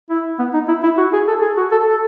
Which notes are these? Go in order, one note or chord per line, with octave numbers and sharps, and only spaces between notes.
E4
B3
D#4
E4
E4
F#4
G#4
A4
G#4
F#4
A4
A4